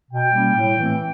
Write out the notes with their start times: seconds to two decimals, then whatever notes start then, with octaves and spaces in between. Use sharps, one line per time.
0.10 B2 G5
0.33 G3 A#3 C#4
0.55 A2
0.78 E3 A3 C4